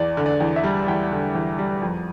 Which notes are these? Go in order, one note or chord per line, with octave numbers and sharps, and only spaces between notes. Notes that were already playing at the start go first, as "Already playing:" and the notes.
Already playing: E2 D5
D3
D5
E2
E5
G3
E2 G5
D3
E2
G3
F2